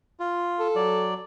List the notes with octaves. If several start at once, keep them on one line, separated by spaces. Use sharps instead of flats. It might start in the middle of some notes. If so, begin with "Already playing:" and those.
F4
A4
F#3 D5